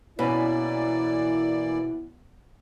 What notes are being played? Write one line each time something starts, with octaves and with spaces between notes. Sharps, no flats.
B2 E3 A#3 C#4 E4 B4 D5